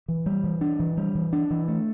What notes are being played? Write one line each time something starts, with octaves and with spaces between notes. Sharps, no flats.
E3
G3
E3
D4
E3
G3
E3
D4
E3
A3